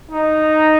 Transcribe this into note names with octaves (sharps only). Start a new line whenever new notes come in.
D#4